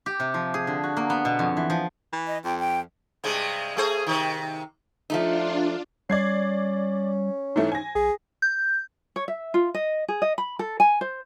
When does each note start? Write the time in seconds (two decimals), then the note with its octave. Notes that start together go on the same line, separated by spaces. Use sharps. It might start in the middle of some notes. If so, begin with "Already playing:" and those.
0.06 G4
0.20 C3
0.34 F3
0.54 G#4
0.67 D3
0.83 F#4
0.97 A#3
1.10 B3
1.25 B2
1.39 F2
1.57 E3
1.70 F3
2.13 E3
2.27 D#5
2.45 F2 G5
2.59 G5
3.24 G2 C3 G#3
3.77 A3 G#4 C5
4.07 C3 D#3
5.10 F3 A3 D4 D#4 F4
6.10 G3 C#4 D5 G#6 C7
7.56 G#2 E3 A3 D#4
7.72 G#5 A#6
7.95 B1 G#4
8.42 G6
9.16 C#5
9.28 E5
9.54 F4
9.74 D#5
10.08 G#4
10.22 D#5
10.38 B5
10.59 A4
10.80 G#5
11.01 C5